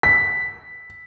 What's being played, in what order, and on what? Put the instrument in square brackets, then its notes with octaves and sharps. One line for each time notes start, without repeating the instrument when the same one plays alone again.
[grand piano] B6